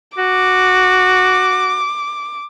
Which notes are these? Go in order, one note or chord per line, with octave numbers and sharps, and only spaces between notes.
F#4 D6